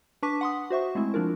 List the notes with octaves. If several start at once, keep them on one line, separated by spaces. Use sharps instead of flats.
D4 B4 A5 C#6 D6 B6
F#5 C6 D#6
F#4 C5 E5 C#6
G#3 A3 C4 E4
F3 D4 F4 A#4